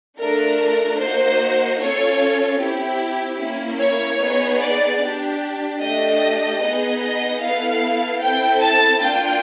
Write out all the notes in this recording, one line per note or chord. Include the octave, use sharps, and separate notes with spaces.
A3 D4 F4 A4 A#4
A#3 D#4 F#4 C5
C#4 F4 A4 C#5
C4 E4 G4
A#3 C#4 E4
C#5
B3 D#4 G#4
D5
D4 G4
A3 D4 G4 D#5
B3 D#4 G#4 D#5
D#5
B3 E4 A4 F5
C4 E4 A4 G5
A5
A#3 D4 F4 G5